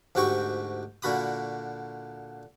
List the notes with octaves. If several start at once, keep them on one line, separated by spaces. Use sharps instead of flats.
D2 G#2 F#4 G4 G5 C#6
A#2 D3 F#4 B5 D#6